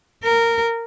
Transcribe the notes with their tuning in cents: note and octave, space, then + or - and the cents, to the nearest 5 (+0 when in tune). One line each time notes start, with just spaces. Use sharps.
A#4 -15